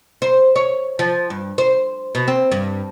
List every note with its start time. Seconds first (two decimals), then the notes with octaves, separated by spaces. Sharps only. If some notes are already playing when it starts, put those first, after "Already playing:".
0.22 C5
0.56 C#5
0.99 F3
1.30 G2
1.58 C5
2.15 B2
2.28 C4
2.52 G2